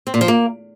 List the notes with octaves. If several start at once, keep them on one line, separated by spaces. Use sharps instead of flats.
C4
A#2
F3
A#3